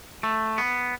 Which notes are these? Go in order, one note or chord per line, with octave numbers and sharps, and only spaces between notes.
A3
B3